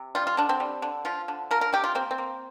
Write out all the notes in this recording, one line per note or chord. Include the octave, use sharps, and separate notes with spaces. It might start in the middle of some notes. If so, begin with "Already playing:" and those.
Already playing: C3
G3 F4
F4
D3 D4
C4
G3
D3
F3 F4
D3
F3 A#4
A#4
C3 G4
F4
A#3 C4
C4
A#3